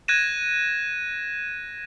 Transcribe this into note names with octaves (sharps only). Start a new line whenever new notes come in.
F#6 G#6 A#6 D#7 E7